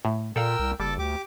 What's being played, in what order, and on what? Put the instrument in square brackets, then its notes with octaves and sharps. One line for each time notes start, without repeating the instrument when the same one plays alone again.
[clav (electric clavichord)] A2
[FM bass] A#2 [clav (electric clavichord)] A4 D5 F5 [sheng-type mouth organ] A#4 G5 E6
[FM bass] C2
[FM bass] F#1 [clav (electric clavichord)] G3 [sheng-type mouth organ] A4 A5 D6
[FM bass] D2 [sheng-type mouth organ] G4 D6